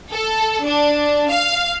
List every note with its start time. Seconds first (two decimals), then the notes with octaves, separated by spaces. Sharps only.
0.12 A4
0.64 D4
1.30 F5